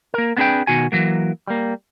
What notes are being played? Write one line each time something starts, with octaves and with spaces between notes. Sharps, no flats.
A#3 A#4
B3 C4 D4 G#4 B4 G5
B2 D#3 F#4 G#5
E3 F#3 A#3
G3 A#3